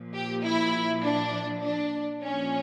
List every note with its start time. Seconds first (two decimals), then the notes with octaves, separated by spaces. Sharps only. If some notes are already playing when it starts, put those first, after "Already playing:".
Already playing: A#2 F3
0.14 G4
0.44 E4
1.03 D4
1.62 D4
2.22 A#2 F3 C#4